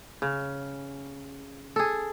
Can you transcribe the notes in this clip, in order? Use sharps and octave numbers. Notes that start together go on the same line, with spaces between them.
C#3
G#4 A4